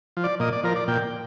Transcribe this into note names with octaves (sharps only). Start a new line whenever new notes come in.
F3
D5
A#2 D#5
D5
F3 A#4
D5
A#2 G5